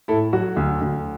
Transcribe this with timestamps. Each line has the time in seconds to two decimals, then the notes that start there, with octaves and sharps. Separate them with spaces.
0.08 A2 E4 A4
0.33 F#3 F#4
0.56 D2
0.81 D2